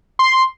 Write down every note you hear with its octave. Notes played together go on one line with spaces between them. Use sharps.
C6